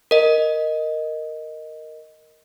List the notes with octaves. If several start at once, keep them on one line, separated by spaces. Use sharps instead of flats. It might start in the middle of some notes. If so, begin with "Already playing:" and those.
A#4 D#5